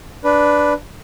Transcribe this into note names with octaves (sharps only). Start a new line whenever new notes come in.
D4 B4